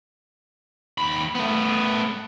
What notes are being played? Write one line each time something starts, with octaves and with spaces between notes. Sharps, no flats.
D#2 B5
A3 B3